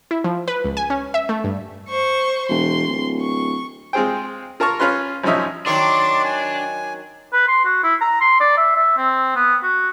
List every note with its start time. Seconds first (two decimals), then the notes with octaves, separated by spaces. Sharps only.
0.11 E4
0.24 F3
0.48 B4
0.64 C#2
0.77 G#5
0.90 C#4
1.14 E5
1.29 A3
1.44 G2
1.89 C5 C#6
2.49 E1 C6
2.88 D1
3.21 C#6
3.93 G#3 C4 F4 G#4 C5 G5
4.60 F4 A#4 A5 A#5 C#6
4.80 C#4 F4 B4 C6
5.23 G#1 F#2 F3 C#4 D#4 E5
5.66 D#3 F#3 D4 C#5 D5 C6 D6
6.24 G#5
7.33 B4
7.48 C6
7.65 F#4
7.83 E4
8.01 A#5
8.21 C6
8.40 D5
8.57 E5
8.76 E5
8.97 C4
9.36 B3
9.63 F#4